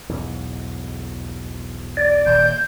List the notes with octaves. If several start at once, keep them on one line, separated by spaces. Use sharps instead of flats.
B1 E2 G#2
D5
D#1 G6